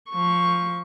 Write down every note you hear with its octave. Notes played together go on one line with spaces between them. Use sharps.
F3 C#6